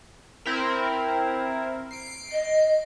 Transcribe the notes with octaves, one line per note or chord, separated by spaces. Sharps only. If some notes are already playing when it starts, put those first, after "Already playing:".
C4 E4 A#4
C7 D7
D#5